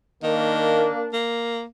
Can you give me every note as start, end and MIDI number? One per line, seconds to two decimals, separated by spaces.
0.23 0.86 51
0.23 1.13 58
0.23 1.13 62
1.13 1.64 58